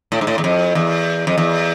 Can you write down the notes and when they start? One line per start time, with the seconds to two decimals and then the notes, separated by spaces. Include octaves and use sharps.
0.12 A2
0.21 G#2
0.27 A2
0.38 E2
0.44 F2
0.75 E2
1.27 F2
1.38 E2